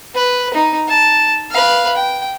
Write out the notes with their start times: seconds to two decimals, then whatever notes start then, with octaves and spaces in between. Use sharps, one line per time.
0.15 B4
0.54 D#4
0.88 A5
1.51 B4 F5
1.96 G5